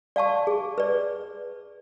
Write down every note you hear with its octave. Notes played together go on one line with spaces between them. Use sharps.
D5 F5 A5 C#6
G#4
B4 D5